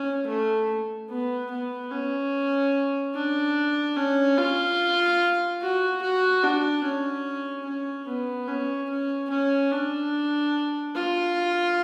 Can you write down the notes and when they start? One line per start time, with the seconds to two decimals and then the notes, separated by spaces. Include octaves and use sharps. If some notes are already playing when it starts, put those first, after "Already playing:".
Already playing: C#4
0.27 A3
1.09 B3
1.51 B3
1.91 C#4
3.14 D4
3.96 C#4
4.38 F4
5.61 F#4
6.02 F#4
6.44 D4
6.84 C#4
7.66 C#4
8.07 B3
8.48 C#4
8.89 C#4
9.30 C#4
9.72 D4
10.95 F4